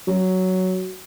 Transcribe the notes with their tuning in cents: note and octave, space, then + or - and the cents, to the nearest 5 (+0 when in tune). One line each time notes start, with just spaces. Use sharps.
F#3 +5